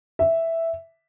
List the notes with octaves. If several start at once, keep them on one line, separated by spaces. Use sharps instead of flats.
E5